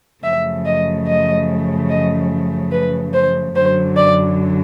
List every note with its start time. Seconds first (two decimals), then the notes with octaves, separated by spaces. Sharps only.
0.23 F#2 C#3 F3 A3 E5
0.65 D#5
1.06 D#5
1.90 D#5
2.72 B4
3.13 C5
3.55 F#2 D3 F#3 C5
3.96 D5